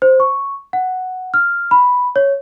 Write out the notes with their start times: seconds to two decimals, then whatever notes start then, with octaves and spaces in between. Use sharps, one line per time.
0.02 C5
0.20 C#6
0.73 F#5
1.34 F6
1.71 B5
2.16 C#5